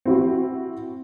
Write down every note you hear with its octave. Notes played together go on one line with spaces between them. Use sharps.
C4 E4 F#4